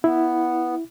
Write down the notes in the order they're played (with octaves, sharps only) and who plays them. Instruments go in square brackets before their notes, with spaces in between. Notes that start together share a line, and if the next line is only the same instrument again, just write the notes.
[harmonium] B3 [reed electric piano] E4